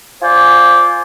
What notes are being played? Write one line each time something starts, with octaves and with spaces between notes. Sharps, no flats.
F4 C5 D5 G#5